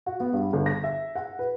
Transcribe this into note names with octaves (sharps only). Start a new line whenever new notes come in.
F#4
B3
G2
G1
A#6
E5
F#5
B4